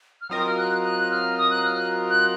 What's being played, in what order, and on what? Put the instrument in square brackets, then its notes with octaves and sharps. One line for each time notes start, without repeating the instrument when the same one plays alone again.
[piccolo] F6
[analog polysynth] F#3 C4 F4 A#4 D#5 [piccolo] D#6
[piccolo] F6
F#6
F#6
F#6
F6
D#6
F#6
F6
F#6
F#6